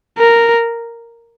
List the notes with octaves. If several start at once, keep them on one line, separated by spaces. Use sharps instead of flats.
A#4